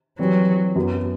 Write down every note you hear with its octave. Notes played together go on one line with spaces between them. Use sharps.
E3 F#3 G3 C4
F#2 F#3 B3